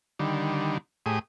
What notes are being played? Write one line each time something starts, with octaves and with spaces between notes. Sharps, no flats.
D3 D#3 G3
A2 G4 G#4 D#6